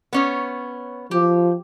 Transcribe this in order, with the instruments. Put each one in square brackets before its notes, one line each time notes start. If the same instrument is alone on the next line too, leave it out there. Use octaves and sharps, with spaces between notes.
[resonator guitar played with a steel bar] B3 C#4 C#5
[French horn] F3 [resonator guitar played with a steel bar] G4